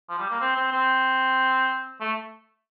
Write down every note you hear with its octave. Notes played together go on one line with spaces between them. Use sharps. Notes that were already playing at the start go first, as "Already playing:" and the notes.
F3
G3
A#3
C4
C4
C4
A3